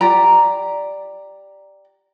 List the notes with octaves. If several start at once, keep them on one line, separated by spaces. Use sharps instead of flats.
G4 D5 A#5